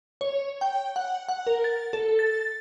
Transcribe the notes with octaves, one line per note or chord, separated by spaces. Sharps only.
C#5
G5
F#5
F#5
A#4
A6
A4
A6